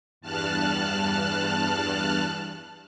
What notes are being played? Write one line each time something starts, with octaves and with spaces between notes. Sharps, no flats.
E2 G2 A5 F6 F#6